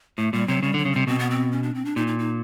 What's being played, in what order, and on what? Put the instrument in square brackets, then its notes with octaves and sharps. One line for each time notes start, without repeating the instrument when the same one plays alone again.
[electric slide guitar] A2 [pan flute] A3
[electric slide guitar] A#2 [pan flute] G3
[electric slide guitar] C3 [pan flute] F#3
[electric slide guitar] C#3 [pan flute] G3
[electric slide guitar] D3
[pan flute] F#3
[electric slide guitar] C#3
[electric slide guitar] C3 [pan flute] G3
[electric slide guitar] B2 [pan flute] C4
[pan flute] B3
C4
C#4
D4
C4
D4
[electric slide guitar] A#2 [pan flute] D#4
[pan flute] D#4
D#4